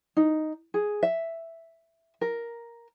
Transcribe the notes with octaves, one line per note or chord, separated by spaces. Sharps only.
D#4
G#4
E5
A#4